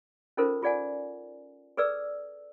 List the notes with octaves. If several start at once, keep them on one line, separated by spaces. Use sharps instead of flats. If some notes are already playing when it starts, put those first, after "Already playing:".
C#4 D#4 F4 A4 A#4 C5
F4 G#4 D5 F#5 G#5
G#4 A4 B4 D5 E6